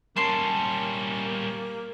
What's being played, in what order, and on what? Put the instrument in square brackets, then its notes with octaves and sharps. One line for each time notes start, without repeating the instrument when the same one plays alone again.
[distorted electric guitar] G3 C#4 [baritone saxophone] A#3 [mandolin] A5 C6